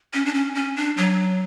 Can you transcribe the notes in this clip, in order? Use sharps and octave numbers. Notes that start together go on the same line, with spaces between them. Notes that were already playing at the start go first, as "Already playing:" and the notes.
C#4
D4
C#4
C#4
D4
F#3